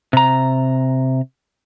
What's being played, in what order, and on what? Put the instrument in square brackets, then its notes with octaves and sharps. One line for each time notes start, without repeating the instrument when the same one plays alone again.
[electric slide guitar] C3 A#5